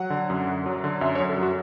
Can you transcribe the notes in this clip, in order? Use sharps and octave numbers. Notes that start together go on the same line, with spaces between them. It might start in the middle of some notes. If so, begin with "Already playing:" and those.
Already playing: F#3 F#5
D3
F#2
F#2
F#3
D3
F#2 E5
C#5
F#2
A4
F#3
F#4